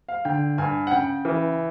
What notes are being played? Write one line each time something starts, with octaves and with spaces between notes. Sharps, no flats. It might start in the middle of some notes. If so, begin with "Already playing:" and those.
F5
D3 G5
G2 G#5
F#5
C#3 G5
E3